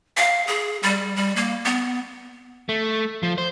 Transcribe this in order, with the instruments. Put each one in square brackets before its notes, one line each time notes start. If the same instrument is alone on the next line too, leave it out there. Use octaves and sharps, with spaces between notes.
[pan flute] F5
G#4
G3
G3
A#3
B3
[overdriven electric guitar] A3
F3
C5